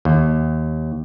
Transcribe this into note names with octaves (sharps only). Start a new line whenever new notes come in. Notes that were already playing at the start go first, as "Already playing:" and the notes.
D#2